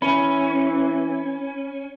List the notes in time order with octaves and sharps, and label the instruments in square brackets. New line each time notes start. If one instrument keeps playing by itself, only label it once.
[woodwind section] E3 [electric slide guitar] C#4 [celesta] G#5 B5